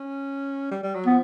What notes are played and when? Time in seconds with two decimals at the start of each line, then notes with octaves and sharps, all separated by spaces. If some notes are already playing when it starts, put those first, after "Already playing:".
Already playing: C#4
0.71 G3
0.83 G3
0.95 F#3
1.07 F3 B3